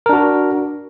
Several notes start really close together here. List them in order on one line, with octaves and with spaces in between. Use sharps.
A#4 D4 F#4